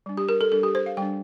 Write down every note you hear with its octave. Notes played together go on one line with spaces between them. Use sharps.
G3 D4
G4
A#4
A4
G3 D4 A4
G4
C5
F5
G3 D4 G5